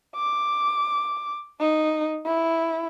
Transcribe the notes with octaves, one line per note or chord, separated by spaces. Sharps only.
D6
D#4
E4